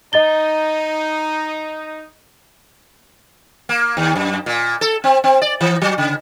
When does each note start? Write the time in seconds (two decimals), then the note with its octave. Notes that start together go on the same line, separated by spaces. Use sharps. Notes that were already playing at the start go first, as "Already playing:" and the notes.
0.13 D#4 D#5 A6 G7
3.69 A#3
3.97 D#2
4.15 F#2
4.46 A#2
4.81 A4
5.04 C4
5.24 C4
5.42 D5
5.61 E3
5.82 F#3
5.98 C#3